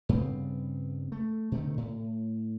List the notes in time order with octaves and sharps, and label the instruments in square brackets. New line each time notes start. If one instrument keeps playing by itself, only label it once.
[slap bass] G2 C#3 B3 C4
A3
B2 D3 D#3 A3
A2